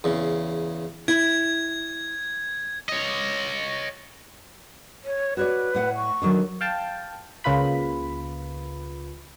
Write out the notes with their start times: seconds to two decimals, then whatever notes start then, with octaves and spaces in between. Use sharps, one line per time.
0.04 E2 C#3
1.08 E4 G#6
2.89 C#5 D#5
5.04 C#5
5.37 F#4 B4 C#5 D5
5.75 A2 F#5
5.96 C#6
6.22 D3 D#3 F#3
6.61 F5 G5 A5
7.44 C#2 C#3 A#3 F4 B4 B5